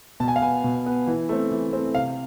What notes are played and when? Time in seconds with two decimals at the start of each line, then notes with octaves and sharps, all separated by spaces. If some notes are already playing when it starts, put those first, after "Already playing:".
0.20 B2 A5
0.28 G#5
0.36 F5
0.42 B3 G#5
0.64 B2
0.86 B3
1.07 E3
1.29 A3 C4
1.51 E3
1.73 A3 C4
1.95 C3 F5